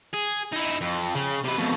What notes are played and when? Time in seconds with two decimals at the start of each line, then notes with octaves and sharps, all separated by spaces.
0.13 G#4
0.52 D#4 E4
0.81 F2
1.15 C#3
1.44 C3 B4
1.58 F2 B2